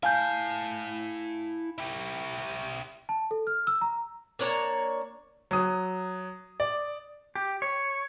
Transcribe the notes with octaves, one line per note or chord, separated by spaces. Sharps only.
E4 F5 G#5 A5 G6
E4 G4
A5
A4
F6
E6
A#5
A#3 D4 C#5 A#5
F#3 D#6
D5
G4
C#5